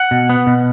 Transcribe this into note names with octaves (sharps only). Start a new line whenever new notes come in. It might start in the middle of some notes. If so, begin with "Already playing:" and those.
Already playing: F#5
B2
B3
B2